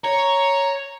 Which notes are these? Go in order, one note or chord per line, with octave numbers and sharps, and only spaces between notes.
C#5 A#5